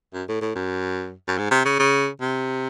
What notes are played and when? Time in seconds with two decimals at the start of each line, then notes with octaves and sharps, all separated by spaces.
0.14 F#2
0.28 A2
0.41 A2
0.56 F#2
1.28 F#2
1.38 G#2
1.51 C3
1.65 C#3
1.79 C#3
2.21 C3